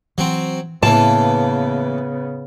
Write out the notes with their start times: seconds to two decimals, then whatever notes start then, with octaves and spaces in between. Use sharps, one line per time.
0.18 E3 F#3 C4
0.83 A2 C#3 E3 A#3 B3 A5